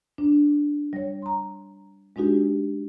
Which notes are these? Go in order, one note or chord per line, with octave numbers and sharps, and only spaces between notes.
D4
G3 C#5
A#5 C6
G#3 D4 D#4 F#4 G4